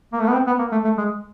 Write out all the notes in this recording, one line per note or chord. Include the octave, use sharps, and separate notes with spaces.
A#3
A3
B3
C4
B3
A#3
A3
A3
G#3